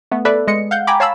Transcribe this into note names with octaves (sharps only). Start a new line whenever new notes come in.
A3 B3
A4 B4 D5 E5
G#3 D#5 C#7
F5 F#5 G6
G5 G#5 A#5 B5 D6
C#5 F5 A5 B5 E6